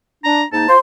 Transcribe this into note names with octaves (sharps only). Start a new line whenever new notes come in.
D4 A#5
G#2 A#3 D#4 A5
F4 C5 C6